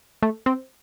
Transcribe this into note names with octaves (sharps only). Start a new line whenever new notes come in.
A3
C4